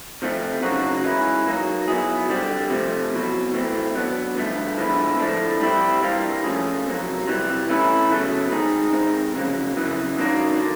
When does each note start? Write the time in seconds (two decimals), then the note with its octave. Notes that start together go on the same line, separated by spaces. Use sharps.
0.22 C3 F3 A3 C4
0.62 C#3 F#3 A#3 D#4 F#4
1.04 E3 G#3 C#4 E4
1.47 F#3 A#3 D#4
1.88 F#3 B3 E4 G#4
2.29 D3 G3 C4
2.70 C3 F3 A3
3.12 E2 B2 F#3
3.53 A2 E3 A3 C4 D#4
3.95 F#3 B3 D4
4.36 G2 D3 F3 A3
4.78 D3 F3 G#3 B3 E4
5.19 A2 F3 A3 D4
5.60 G3 C4 E4
6.02 E3 G3 A#3 D4 F4
6.44 F3 A3 C#4 F4 G#4
6.86 F2 C3 D#3 F#3 A#3
7.28 C3 E3 G3
7.69 E3 A3 C#4 E4
8.10 E2 C#3 F#3 A3
8.51 D#3 G#3 C4 D#4 G#4
8.93 C3 D#3 G#3 C4 D#4
9.34 F2 C#3 F#3 A#3
9.76 F#2 C#3 E3
10.17 F#2 D#3 F#3 A#3 D4
10.60 D3